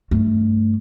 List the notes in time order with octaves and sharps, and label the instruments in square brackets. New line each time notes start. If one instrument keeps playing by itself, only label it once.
[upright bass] G2 A3